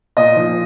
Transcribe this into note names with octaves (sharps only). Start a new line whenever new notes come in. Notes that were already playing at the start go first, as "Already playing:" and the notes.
A#2 D#5
F3